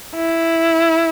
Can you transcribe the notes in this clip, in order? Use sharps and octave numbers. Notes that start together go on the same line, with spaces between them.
E4